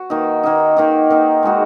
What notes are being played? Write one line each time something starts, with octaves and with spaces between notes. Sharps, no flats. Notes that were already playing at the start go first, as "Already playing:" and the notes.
Already playing: F#4
D#3 A#3 D#4
D#3 A#3 D#4
D#3 A#3 D#4
D#3 A#3 D#4
G#3 D#4 F#4